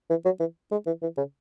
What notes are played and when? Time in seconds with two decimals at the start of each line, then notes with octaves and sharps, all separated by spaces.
0.10 E3
0.25 F#3
0.40 E3
0.71 G#3
0.86 E3
1.02 E3
1.17 C#3